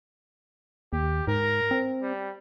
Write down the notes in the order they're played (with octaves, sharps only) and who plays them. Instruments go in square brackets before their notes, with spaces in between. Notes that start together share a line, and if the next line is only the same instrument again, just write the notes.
[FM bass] D#2 [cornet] G4
[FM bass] G#2 [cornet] A#4
[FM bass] C4
[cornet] G3